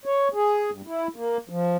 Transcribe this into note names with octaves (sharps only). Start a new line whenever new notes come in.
C#5
G#4
G2
E4
A#3
F3